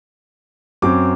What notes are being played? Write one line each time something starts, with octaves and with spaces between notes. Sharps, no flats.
F#2 F#3 C4 D6